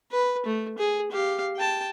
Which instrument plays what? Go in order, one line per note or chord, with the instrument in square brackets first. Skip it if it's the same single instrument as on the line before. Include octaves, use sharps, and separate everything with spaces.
[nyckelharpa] B4
A3
G#4
G4 F5
G5 A5